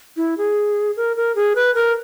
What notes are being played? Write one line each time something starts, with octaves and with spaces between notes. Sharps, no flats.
E4
G#4
A#4
A#4
G#4
B4
A#4